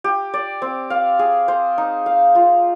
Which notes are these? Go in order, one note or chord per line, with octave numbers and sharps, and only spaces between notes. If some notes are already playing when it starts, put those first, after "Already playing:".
G4
D5
C4
F5
G#4
C5
D#4
F5
F4